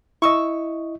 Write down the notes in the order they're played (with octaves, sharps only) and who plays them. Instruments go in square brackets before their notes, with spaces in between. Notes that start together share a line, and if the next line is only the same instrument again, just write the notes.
[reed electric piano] E4 D#5 [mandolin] C#6 E6